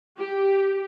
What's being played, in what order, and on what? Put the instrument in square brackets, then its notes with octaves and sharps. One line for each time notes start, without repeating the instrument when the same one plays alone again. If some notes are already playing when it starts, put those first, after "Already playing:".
[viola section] G4